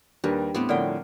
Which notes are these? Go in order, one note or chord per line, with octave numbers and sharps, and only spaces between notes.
D#2 G3 D4 A#4 B4
A2 B3 C4 G4
A2 D3 F3 A#4 C#5 D5 F#5 G5